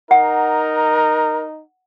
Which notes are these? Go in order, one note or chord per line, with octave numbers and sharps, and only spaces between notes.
D#4 A#4 F#5